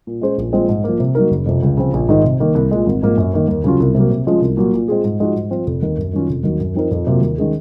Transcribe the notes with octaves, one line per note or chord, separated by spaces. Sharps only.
A#2
G#3 C#4 G#4 C5
A#1
A#2 F3 G#3 C4
G#2
F3 A#3
C3
F#3 A#3 D#4 A#4
F#1
F2 C3
C#2
C#3 F3 C4
A#1
G#2 D#3 G#3 D#4
C3
D#3 A#3
C2
A#2 G#3
G#1
G#2 F3 A#3
F#2
D#3 A#3
D#2
C#3 F#3 C#4 F4
C2
C3 F#3 A#3
C3
F3 G#3 C#4 F4
C2
A#2 F#3 A#3 F4
A#2
G#3 C4 F4 G#4
G#2
F3 G#3 D#4 F#4
G#2
F3 C4 F4
F1
D#2 D#3
F#2
D#3 F#3 C#4 F4
F1
D#2 D#3 F#3
F#2
F3 C4 D#4 A#4
F2
C3 F#3 A#3 F4
D#2
D#3 G#3 C#4 G#4